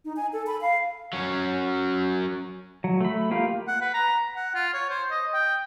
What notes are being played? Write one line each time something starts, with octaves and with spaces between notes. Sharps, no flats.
D#4
G#5
A4
B5
F5
F#3 C#4
F#3
A3 B5
A#3 F4 G4 F5
F#5
B4
A#5
F#5
F4
C#5
C5
D#5
G5